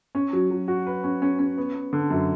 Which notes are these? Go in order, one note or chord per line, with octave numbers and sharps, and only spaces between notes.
C#4
F#3
F#3
F#4
B4
C#4
C#4
C#4
B3
B3
D3
F#2